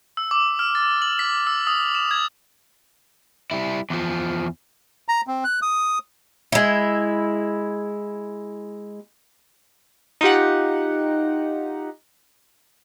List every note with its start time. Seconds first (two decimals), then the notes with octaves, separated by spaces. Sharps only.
0.17 E6
0.31 D6
0.59 F6
0.75 A6
1.02 F#7
1.19 B6
1.47 E6
1.67 D#6
1.95 E7
2.11 G#6
3.51 G3 E4
3.90 E2 F3
5.08 A#5
5.27 C4
5.44 F#6
5.62 D#6
6.52 G#3 E4
10.21 D#4 F4 G4 F#5